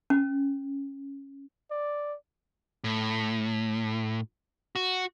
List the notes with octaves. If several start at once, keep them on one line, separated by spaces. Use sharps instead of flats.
C#4
D5
A2
F#4